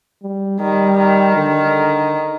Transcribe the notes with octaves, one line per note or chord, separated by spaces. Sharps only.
G3
D#3 G3
D#3
D3